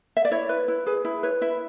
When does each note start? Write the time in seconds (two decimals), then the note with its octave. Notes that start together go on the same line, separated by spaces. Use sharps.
0.17 E5
0.25 D5
0.31 E4 C#5
0.49 B4
0.68 E4
0.86 G#4 B4
1.05 E4
1.23 B4 C#5
1.41 E4 E5